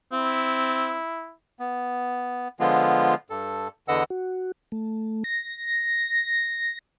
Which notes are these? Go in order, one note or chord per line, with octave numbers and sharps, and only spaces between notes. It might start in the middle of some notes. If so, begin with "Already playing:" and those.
C4 E4
B3
D3 F3 G#3 B3 F4
G2 A4
E2 D3 B4 D#5 F#5 E6
F#4
A3
A#6